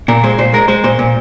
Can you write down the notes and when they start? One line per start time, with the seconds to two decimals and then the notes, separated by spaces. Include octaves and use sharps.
0.08 A#2 A#4
0.24 G#3 C5
0.38 A#2 C5
0.53 G#3 A#4
0.68 G#3 C5
0.84 A#2 C5
0.99 A#2